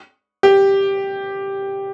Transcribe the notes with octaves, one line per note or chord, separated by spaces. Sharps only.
G4